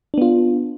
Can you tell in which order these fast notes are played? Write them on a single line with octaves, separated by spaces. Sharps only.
D4 B3 F4